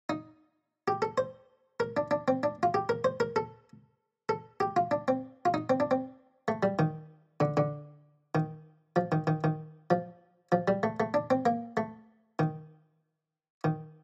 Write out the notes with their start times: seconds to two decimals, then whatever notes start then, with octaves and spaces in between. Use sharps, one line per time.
0.10 D#4
0.88 G4
1.02 A4
1.18 C5
1.80 A#4
1.97 D4
2.11 D4
2.28 C4
2.43 D4
2.63 F4
2.74 G4
2.89 A#4
3.04 C5
3.20 A#4
3.36 A4
4.29 A4
4.60 G4
4.76 F4
4.91 D4
5.08 C4
5.45 F4
5.54 D#4
5.70 C4
5.80 D4
5.91 C4
6.48 A3
6.63 G3
6.79 D#3
7.40 D3
7.57 D3
8.35 D#3
8.96 F3
9.12 D#3
9.27 D#3
9.44 D#3
9.90 F3
10.52 F3
10.68 G3
10.83 A3
11.00 A3
11.14 D4
11.30 C4
11.46 A#3
11.77 A3
12.39 D#3
13.64 D#3